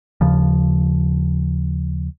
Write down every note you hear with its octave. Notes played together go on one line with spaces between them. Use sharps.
D#2 C#3 F3